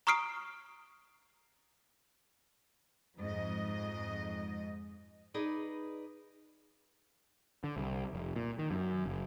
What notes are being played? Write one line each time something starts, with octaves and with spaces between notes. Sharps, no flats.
A#5 C#6 D#6 F6 C7 D7
F2 G#2 D#5
D#4 G#4 B4 D5
D3
C2
F1
A#2
D#3
F#2
F#1